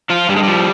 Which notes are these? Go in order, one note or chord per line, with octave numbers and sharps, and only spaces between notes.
F3 F4
G2 G3
G#3
F3 G3